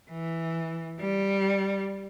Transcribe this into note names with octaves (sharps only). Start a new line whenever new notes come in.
E3
G3